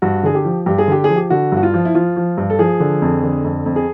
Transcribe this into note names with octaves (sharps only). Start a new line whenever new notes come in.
G2 F#4
D3 G#4
G4
F3
G2 G4
G#4
D3 G4
G#4
F3
G4
D3 F#4
G2 F#4
F4
F3
E4
F3 F4
F3
G2
A4
F3 G#4
D3
F2
D3
F2
F2
G#4